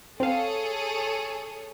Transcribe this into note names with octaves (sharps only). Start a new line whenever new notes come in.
C4 G#4 A4 C#5 F5